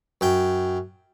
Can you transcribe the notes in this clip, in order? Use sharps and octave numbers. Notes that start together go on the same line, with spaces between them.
F#2 G5